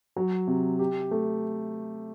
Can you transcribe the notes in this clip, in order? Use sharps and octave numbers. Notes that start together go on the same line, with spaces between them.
F#3
C3
G4
A3